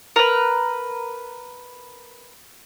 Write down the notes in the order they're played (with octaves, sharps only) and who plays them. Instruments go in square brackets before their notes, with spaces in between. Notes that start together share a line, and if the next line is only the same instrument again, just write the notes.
[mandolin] A#4 B4